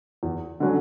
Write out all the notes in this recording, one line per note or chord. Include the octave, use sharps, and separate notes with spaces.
E2
D3 F#3 C#4